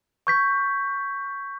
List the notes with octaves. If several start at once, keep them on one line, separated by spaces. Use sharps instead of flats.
C#6 G6 B6